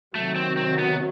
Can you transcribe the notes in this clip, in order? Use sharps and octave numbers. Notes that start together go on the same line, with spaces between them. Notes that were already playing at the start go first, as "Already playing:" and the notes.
C3 D#3 F#3 A3
C4
C4
B3